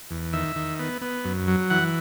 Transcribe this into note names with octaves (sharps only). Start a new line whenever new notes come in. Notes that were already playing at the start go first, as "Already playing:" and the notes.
E2
D#3 E5
D#3
B3
B3
F#2
F#3
E3 F#5